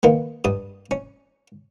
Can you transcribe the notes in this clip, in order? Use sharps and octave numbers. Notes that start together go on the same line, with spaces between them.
D#3 A#3 B3
G2 D#6
C#4